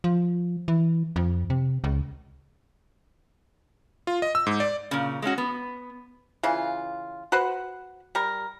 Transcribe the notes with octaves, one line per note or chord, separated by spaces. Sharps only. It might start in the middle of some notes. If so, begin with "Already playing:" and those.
F3
E3
F2
C3
C#2
F4
D#5
E6
G#2
D5
A#2 C#3
G#3 A3 C#4 F#4
B3
C#3 E3 F4
F#4 B4 C5 F#5
G3 A#4